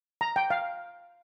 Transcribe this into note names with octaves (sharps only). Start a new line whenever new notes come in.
A#5
G5
F5